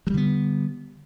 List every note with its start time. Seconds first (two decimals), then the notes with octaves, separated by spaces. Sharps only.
0.07 F#3
0.10 G3
0.14 D3
0.17 B3